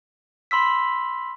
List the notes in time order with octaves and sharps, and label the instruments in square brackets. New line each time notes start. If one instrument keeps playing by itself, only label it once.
[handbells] B5 C6 E6 B6